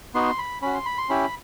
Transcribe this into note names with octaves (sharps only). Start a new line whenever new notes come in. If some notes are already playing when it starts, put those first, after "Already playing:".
B3 D#4 F#4 C6
B5
C#4 F#4 B5
C6
B5
C6
C#4 E4 G4 B5